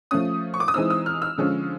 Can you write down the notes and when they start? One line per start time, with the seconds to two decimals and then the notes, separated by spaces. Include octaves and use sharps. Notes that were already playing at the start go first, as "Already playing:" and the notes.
0.11 F3 A3 C#4 D#6
0.54 C#6
0.60 D6
0.68 D#6
0.74 E3 G#3 C4 D#4 E6
0.90 E6
1.06 F6
1.22 E6
1.38 D3 F3 G#3 C#4